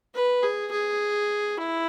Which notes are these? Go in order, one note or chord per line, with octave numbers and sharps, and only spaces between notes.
B4
G#4
G#4
E4